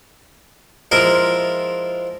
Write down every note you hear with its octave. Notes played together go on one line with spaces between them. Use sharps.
F3 G#3 E4 F4 A#4